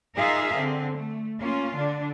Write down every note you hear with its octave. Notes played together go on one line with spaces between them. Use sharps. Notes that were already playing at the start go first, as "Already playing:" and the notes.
D#4 F4 G#4 A#4 E5 F5
D3 C4
A3
A#3 C#4 F4
D3 D4